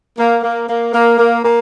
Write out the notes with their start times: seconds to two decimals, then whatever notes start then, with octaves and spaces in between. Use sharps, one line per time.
0.18 A#3
0.43 A#3
0.69 A#3
0.93 A#3
1.18 A#3
1.44 A#3